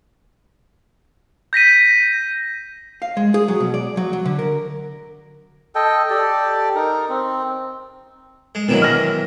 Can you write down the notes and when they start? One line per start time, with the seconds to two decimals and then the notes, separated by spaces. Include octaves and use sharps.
1.53 G6 A#6 B6 D#7
3.02 F5
3.17 G#3
3.34 G#4
3.48 F#3
3.60 B2
3.74 D5
3.97 F#3
4.13 F#3
4.26 D3
4.39 A#4
5.75 A4 D#5 G5
6.10 G4 A4 D5
6.75 D#4 A#4
7.09 C4
8.55 G#3
8.68 B2 D#3 E3 F#3
8.82 F6 A#6